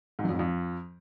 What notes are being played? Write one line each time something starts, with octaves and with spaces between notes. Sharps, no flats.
G#2
F#2
F2
G#2
F2